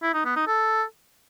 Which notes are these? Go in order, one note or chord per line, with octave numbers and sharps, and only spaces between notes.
E4
D#4
B3
D#4
A4